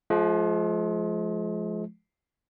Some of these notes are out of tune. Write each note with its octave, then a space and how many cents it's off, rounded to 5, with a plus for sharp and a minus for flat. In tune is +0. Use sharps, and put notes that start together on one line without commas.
F3 +0 G#3 +40